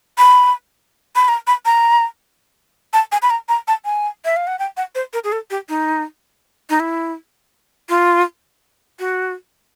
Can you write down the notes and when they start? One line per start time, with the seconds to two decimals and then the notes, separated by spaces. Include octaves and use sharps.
0.18 B5
1.16 B5
1.28 A#5
1.47 B5
1.65 A#5
2.93 A5
3.12 G#5
3.22 B5
3.30 A#5
3.49 A#5
3.68 A5
3.85 G#5
4.25 E5
4.36 F5
4.47 F#5
4.59 G5
4.77 F#5
4.95 C5
5.13 A#4
5.24 G#4
5.32 A4
5.51 G4
5.69 D#4
6.70 D#4
6.80 E4
7.89 F4
8.99 F#4